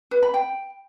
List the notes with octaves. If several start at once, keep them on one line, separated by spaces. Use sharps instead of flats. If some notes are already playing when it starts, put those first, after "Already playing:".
B4
B5
G5